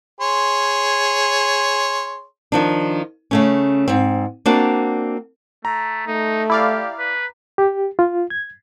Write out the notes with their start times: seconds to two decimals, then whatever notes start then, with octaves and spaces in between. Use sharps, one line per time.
0.21 G#4 C#5 C6
2.52 D#3 F3 D4
3.31 C#3 A3 C#4
3.88 G#2 C4
4.46 A#3 C4 D4 F#4 D5
5.65 A3 A#5
6.07 A3 D#4
6.50 E4 G4 D5 F5
6.98 B4
7.58 G4
7.99 F4
8.30 G#6